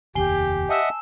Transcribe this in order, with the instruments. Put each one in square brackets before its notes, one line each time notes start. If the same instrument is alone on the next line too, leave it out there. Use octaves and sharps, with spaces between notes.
[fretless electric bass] F1 D#2 [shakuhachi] G4 [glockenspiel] G#5 C7 G7
[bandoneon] D#5 E5 F#5 [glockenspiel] A5 E6 E7